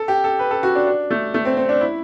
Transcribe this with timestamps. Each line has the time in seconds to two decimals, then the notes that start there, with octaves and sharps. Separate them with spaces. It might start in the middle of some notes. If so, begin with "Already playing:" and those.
Already playing: A4
0.08 G4
0.24 A4
0.39 B4
0.51 A4
0.63 F#4
0.75 D4
0.87 D4
1.11 A3
1.34 A3
1.45 C4
1.57 C4
1.69 D4
1.81 E4